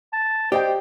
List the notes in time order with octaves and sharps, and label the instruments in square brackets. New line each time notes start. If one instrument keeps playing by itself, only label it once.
[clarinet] A5
[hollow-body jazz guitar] G4 [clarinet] C5 [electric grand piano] D5 D#5 G5